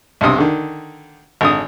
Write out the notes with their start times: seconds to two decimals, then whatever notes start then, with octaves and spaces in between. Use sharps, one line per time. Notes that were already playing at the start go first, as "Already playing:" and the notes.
0.21 B1 G2 C3 D#6
0.38 D3 D#3
1.41 G#1 D3 D#6